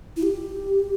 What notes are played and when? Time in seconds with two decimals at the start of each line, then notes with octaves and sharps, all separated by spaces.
0.17 E4
0.23 G4